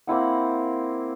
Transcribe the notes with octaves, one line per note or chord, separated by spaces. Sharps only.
A#3 C4 E4 F#5